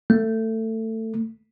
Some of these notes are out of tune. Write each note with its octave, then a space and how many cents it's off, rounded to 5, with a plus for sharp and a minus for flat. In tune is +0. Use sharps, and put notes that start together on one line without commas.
A3 +20